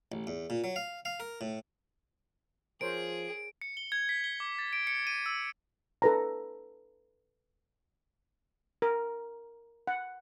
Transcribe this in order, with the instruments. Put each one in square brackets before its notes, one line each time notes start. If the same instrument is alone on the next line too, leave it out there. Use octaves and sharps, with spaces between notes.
[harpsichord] A1
E2
A#2
F#3
F5
F5
A#4
A2
[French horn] F3 [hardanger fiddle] G#4 [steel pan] A#4 C5 C#5 [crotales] D7
[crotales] C#7
G7
G#6
B6
G7
D6
A6
D7
C#7
D#7
E6
[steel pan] A4 B4 A#5
A#4
F#5